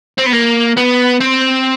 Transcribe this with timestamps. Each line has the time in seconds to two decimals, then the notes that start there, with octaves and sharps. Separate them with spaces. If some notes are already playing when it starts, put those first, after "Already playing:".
0.19 C4
0.27 B3
0.33 A#3
0.78 B3
1.21 C4